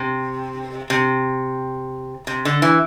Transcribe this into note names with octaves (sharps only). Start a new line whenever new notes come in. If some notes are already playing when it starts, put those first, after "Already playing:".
Already playing: C3
C3
C3
D3
E3